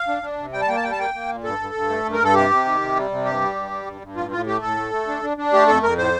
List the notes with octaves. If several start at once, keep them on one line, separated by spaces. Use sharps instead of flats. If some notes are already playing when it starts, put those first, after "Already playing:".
Already playing: F5
D4
D4
C3
G3 G5
A5
A#3 G5
A5
G3 G5
A5
A#3 G5
A#3
A#2
G2 A4
G2
G2
A3
G2
A#4
G2 A4
C3 G4
C3
D#3
C3
G3
C3
G2 G4
G3
G2
G3
G2
G2
A2 F4
A2 F4
A3 G4
A2 A4
A3
A3
D4
D4
D4
A3 G4
F2 A4
F2 A#4
A2 C5